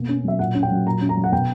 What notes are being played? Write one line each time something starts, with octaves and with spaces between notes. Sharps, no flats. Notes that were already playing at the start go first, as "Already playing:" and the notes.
Already playing: B2 A#3
C#4
F#3 E5
A#2 F#5
C#4
G5
F#3
A#2 A#5
C#4
A#5
F#3
F#5
B2 G5